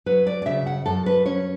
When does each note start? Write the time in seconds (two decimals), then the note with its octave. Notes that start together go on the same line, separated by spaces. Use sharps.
0.06 F#3 B4
0.27 D5
0.42 D5
0.46 C#3 E5
0.67 F#5
0.86 F#2 A4
1.06 B4
1.26 C#4 C#5